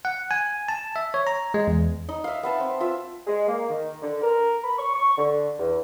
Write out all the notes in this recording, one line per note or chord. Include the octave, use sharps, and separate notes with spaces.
F#5
G#5
A5
E5
C#5
A#5
G#3
E2
D#4
E5 F5
B3 E5 A5
C4
F4 E5
G#3
A#3
D#3
D3
A#4
B5
C#6
C#6
D3
E2